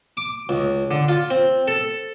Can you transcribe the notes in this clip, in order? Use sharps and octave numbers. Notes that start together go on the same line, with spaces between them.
D6
C#2
D3
F4
C4
A4